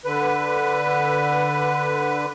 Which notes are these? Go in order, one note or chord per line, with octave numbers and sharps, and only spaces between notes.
D3 B4